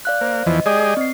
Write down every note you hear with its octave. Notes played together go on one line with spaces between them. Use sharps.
D5 F5 F#6
A#3 C5
E2 E3 F3 D#5
G#3 G4 G#4 D5 D#5 D#6
C4 C7